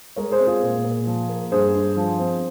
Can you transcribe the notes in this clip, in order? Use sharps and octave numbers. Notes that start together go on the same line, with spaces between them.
G#3 A#4 C#5
G#4 C5
C4
F4 G#4
A#2
A#2
F3
A#3
G2 G#4 C5
G2
F3
C4